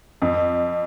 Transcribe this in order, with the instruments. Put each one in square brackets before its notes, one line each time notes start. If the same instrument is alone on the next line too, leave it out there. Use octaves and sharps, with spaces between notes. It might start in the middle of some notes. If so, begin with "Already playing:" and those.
[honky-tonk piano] F2